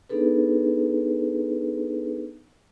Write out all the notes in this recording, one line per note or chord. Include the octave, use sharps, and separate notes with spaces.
B3 D4 D#4 G#4 A4 B4